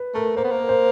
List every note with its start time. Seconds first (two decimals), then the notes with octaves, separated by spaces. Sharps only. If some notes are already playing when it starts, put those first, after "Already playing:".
Already playing: B4
0.14 A3 A#4
0.37 A#3 C5
0.44 B3
0.51 A#3
0.69 C5